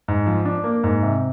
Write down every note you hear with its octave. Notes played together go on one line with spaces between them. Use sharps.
G#2
F3
D4
A#3
G#2
C3